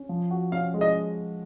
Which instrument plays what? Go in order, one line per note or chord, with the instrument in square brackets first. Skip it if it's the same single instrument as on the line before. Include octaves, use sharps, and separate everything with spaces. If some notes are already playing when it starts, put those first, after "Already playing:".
Already playing: [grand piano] C#4
F3
F#4
[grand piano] C#4 [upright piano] F5
[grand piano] G#3
[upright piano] D#5